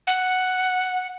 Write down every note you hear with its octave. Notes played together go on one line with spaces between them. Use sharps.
F#5